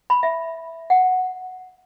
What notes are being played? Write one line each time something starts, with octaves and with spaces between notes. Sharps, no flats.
B5
E5
F#5